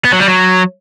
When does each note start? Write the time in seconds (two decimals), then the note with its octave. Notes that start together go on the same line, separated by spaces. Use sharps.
0.05 B3
0.13 F#3
0.20 G3
0.28 F#3